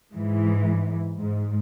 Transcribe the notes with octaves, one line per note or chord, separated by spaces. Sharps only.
G#2 E3
G#2